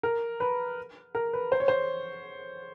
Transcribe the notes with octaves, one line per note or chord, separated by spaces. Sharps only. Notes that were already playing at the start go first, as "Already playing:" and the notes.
A#4
B4
A#4
B4
C5
C#5
C5